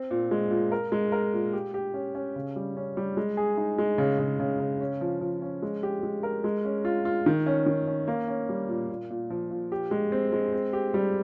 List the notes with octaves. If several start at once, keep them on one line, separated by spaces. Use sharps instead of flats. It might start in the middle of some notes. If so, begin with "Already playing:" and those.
Already playing: C4
A#2
G#3
A#2
A#4
G#3
A#4
A#2
G4
G4
C#4
C#4
C#3
G3
C#4
G3
G#3
G#4
D#4
G#3
C#3
C#3
C#3
C#3
C#4
F3
F3
C#4
G#3
G4
G#3
A#4
G#3
C#4
F4
F4
D#3
C#4
D#3
C#4
A#3
C#4
G3
A#2
A#2
A#2
F3
A#2
G4
G#3
C4
G#3
C4
G4
G3